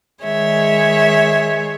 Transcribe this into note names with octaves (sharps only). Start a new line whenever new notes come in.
D#3 G#3 G#4 C#5 E5